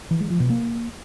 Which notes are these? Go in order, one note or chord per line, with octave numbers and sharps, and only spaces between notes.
E3
G#3
F3
B2
A#3